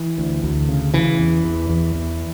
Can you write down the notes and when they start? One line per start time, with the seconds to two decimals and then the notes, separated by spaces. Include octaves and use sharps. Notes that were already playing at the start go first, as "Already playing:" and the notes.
Already playing: E3
0.18 D2
0.43 D2
0.69 C#3
0.94 C#3 E3
1.19 E2
1.44 E2
1.69 E2
1.95 E2